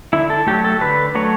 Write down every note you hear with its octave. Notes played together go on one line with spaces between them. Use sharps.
D3 E4
A4
F#3 A3 G4
A4
D3 B4
F#3 A3 C#5